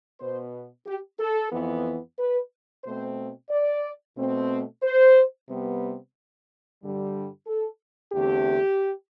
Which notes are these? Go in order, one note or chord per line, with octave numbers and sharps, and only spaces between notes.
B2 B3 C5
G4
A4
F2 E3 B3
B4
B2 A3 C4 C5
D5
B2 A3 C4
C5
C3 G3 B3
G2 D3 G3
A4
E2 D3 A3 C4 G4